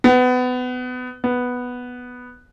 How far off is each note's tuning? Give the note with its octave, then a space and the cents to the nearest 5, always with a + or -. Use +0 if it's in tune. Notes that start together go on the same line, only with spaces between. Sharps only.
B3 +25
B3 +0